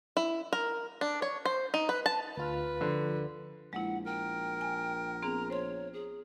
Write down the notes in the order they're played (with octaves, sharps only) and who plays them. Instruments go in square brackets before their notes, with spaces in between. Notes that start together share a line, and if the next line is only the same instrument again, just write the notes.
[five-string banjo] E4
A#4
D4
C#5
C5
D#4
B4
A5
[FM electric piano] D2 F4 F6 [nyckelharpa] B4
[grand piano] D3 [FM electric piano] F3
[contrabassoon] A#1 [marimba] G#3 E4 [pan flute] F#5
[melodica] A#4 [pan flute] G5
[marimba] G#5
[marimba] B3 C4 G#4 [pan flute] A#5
[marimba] C5 C6 [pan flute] C#5
[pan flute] G#4